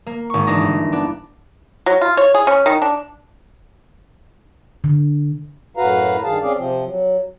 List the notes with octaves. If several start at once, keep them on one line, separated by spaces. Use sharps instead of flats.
A#3
G#1 C#6
E3 D4 D#4 A#6
G1
B3 D4
F#3
F4
C#5
G#4
C#4
D#3
D4
D3
F#2 A2 F#4 B4 F5 A#5
G2 D#3 G#4 F5 A5
C4 C#4 G#4 D5 F5
C3 F3 C4
F#3